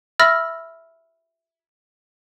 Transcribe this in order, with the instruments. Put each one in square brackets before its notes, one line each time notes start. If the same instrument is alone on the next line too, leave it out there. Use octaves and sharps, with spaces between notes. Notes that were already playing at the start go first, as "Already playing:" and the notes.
[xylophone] E5 B5 E6 F6 A6 A#6